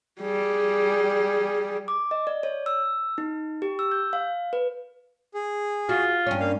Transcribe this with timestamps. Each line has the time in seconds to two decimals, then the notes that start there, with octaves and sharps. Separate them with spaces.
0.21 G3 G#4
1.88 D6
2.11 D#5
2.27 D5
2.43 C#5
2.66 E6
3.18 D#4
3.62 G4
3.79 E6
3.92 G6
4.13 F5
4.53 B4
5.34 G#4
5.89 F4 F#4
6.27 G2 C#4
6.40 A#3 F5